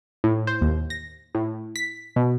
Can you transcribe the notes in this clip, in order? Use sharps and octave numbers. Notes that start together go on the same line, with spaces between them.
A2
C5
D#2
A#6
A2
B6
B2